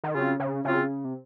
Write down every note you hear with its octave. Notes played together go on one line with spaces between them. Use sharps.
D#3
C#3 F#3 C4 F4
C#3
C#3 F#3 C4 F4
C3